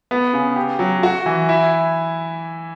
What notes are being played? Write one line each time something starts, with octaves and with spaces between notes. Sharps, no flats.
B3
C#3
G4
F#3
F#4
E3
E4